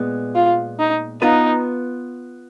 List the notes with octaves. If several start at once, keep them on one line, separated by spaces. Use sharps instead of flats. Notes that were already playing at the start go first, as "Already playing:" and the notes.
Already playing: A#2 G#3 B3
F4
D#4
B3 D#4 F4 B4